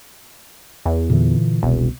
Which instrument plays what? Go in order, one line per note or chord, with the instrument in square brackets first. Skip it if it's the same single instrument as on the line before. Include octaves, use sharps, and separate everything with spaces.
[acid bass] E2
[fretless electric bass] A#2 D3 E3
[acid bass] E1 [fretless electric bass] C2 B2